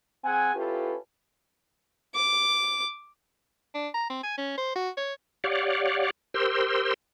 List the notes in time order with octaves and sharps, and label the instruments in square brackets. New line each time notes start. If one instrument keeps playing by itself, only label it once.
[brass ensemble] C4 G#4 F#5 G#5
C#4 E4 F4 G4 A4 B4
[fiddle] D6
[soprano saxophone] D4
A#5
C4
G#5
C#4
C5
F#4
C#5
[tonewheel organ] G4 C#5 D5 F5 F#5
G4 A#4 C5 C6 E6